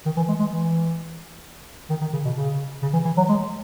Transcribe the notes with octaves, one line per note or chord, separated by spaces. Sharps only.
D#3
E3
G#3
G#3
E3
D#3
D#3
C#3
B2
C#3
C#3
E3
E3
F#3
G#3